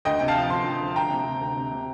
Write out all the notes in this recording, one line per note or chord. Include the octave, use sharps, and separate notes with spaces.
D2 D#5 G5
C3 G5
F5 A5
F3
D2 A5 C6
F3
D2
D2 G5 A#5
C3
C3
D2
C3
C3